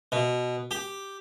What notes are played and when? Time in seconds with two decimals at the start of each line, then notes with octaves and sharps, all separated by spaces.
0.12 B2
0.71 G4